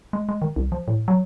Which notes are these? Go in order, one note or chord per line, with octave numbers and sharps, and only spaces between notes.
G#3
G#3
D#3
C2
F3
A2
F#3